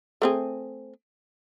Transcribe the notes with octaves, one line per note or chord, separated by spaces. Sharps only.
A3 C4 G#4